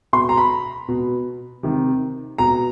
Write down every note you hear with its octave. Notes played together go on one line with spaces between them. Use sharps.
B2 C6
A#5
B5
B2
C3 D#3
B2 A#5